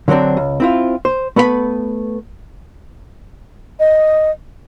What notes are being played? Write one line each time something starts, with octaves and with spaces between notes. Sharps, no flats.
D3 F#3 B3 C4 D4
C#2
C4 E4 F4
C5
A3 B3 B4 E5 B5
D#5